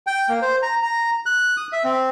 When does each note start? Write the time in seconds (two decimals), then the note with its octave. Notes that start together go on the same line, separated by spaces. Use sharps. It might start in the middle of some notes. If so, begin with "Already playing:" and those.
0.07 G5
0.29 A#3
0.42 C5
0.62 A#5
0.83 A#5
1.26 F#6
1.57 D#6
1.73 E5
1.84 C4